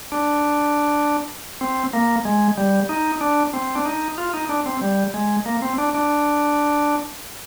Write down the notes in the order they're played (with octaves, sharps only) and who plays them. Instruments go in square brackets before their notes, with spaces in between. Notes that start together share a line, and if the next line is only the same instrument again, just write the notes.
[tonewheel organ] D4
C4
A#3
G#3
G3
D#4
D4
C4
D4
D#4
F4
D#4
D4
C4
G3
G#3
A#3
C4
D4
D4